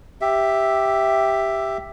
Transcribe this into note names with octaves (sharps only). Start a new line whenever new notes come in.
G4 E5